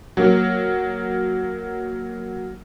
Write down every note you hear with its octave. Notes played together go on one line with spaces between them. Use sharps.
F#3 A#3